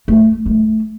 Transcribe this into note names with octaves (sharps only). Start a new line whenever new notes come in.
A3
A3